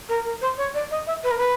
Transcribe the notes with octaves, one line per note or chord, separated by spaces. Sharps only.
A#4
A#4
C5
C#5
D5
D#5
E5
B4
A#4
B4